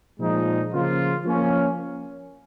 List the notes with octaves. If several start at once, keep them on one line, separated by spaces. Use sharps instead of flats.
A#2 F3 G#3 D#4
C#3 F3 A#3 F4
F3 A#3 C#4